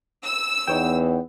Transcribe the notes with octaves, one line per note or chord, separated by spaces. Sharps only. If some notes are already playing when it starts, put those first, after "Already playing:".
E6
E2 B3 D#4 C#5 G5